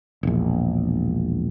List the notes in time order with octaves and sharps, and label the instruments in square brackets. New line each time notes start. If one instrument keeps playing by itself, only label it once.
[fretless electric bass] E1 A#1